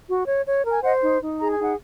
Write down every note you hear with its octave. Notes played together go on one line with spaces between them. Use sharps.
F#4
C#5
C#5
A#4
G#5
C5 D#5 F#5
D#4
D#4
G#4 A#5
G#5
D#4 F#5